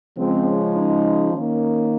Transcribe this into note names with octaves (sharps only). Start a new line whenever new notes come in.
C#3 F3 G#3 C4
C#4
D#4
D#3 A#3 C#4